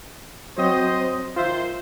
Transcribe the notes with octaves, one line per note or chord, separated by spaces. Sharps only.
F#3 C4 C5 C#5 D#5
D#3 F4 C5 E5